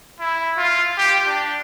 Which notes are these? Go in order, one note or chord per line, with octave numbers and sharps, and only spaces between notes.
E4
F4
G4
D4